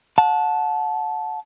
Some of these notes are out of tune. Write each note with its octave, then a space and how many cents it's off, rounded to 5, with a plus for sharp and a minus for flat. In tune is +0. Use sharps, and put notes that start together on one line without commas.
F#5 -30 A5 -15